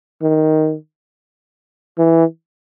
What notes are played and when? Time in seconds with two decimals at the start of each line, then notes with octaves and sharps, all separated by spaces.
0.22 D#3
1.98 E3